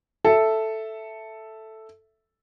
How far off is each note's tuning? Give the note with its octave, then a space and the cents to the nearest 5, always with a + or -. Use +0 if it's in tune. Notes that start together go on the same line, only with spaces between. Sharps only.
A4 +0 E5 +0